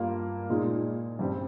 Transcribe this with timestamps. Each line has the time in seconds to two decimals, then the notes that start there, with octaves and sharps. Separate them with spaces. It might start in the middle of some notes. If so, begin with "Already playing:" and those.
Already playing: G2 G3 A#3 F4
0.50 A#2 G#3 D#4
1.19 G2 G3 C4